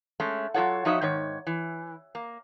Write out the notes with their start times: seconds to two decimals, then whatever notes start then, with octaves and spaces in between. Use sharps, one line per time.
0.20 G#3 A3 C#4
0.54 F#3 F4 A4 C#5 F#5
0.85 F3 D#4 F#4 C#5 D#5 E5
1.02 G#2 D#3 C#5
1.47 E3
2.15 A#3